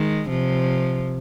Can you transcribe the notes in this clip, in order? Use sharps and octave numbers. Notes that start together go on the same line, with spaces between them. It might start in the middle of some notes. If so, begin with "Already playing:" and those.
Already playing: D#3 G#3
C3 F3